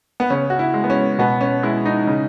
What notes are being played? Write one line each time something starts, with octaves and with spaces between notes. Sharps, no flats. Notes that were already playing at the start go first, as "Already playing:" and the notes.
B3
C#3 C#4
F#4
E4
G#3
B3
C#4
B2 B3
C#4
G#3 E4
D#4
C#3